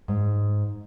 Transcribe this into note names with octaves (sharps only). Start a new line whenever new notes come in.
G#2